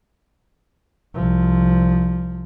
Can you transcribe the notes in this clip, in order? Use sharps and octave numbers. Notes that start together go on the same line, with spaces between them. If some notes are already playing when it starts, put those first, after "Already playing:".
C2 F3